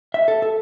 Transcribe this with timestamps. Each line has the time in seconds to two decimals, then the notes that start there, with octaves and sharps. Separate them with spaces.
0.14 E5
0.28 A4
0.42 A4